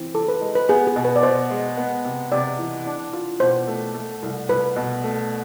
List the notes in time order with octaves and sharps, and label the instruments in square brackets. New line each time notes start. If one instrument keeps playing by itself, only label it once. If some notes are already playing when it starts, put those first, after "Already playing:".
Already playing: [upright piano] E3 C4
[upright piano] E3 [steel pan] A4
[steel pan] B4
[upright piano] G#3
[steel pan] B4
[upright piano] B3 [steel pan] G#4
[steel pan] G#4
[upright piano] B2
[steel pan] B4
D5
[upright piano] B2 [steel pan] C5
[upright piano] G#3
B3
C3
[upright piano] C3 [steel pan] D5
[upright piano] E3
D4
F4
[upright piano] B2 [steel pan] C5
[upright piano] A3
A3
C2
[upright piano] C2 [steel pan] B4
[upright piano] B2
A3